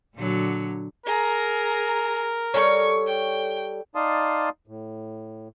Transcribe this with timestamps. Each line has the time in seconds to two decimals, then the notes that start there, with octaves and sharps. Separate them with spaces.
0.15 A#2 D3 F#3
1.06 G#4 A#4 A#5
2.54 G3 A4 C#5 C#6
3.07 G5
3.95 D#4 D5 F5 A5 C6 D#6
4.67 A2